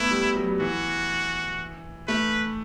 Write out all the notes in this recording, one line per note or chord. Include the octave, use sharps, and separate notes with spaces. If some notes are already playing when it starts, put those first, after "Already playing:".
Already playing: A3 B3 E4
G3
F#3
G3
E3 F#4
A3 B4